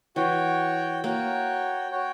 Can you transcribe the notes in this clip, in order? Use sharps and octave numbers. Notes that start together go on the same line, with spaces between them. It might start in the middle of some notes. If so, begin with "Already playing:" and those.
E3 F#4 C#5 G5
A#3 F#4 C#5 G5
F#4 C#5 G5